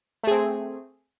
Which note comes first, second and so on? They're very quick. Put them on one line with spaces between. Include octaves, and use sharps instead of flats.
A3 G#4 C4